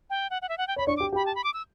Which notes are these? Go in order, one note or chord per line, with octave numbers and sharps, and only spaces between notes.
G5
F#5
F#5
E5
F#5
G5
C#5 B5
D4 D5 C#6
G4 G5 D6
G4 G5 B5
A5
B5
D6
E6